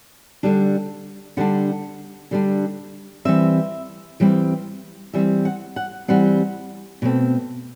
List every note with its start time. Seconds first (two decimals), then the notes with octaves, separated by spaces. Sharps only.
0.43 D3 G3 D4
1.37 D3 G3 D4 F#5
2.31 D3 G3 D4
3.25 E3 G3 C4 E5
4.20 E3 G3 C4
5.13 E3 G3 C4 E5
5.45 F#5
5.76 F#5
6.08 E3 G3 C4 F#5
7.02 B2 A3 C4